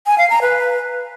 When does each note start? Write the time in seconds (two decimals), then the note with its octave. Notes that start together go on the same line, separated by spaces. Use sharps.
0.06 G#5
0.18 F5
0.30 A#5
0.42 B4